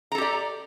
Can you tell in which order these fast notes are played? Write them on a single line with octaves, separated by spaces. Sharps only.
A#5 A4 G4 D5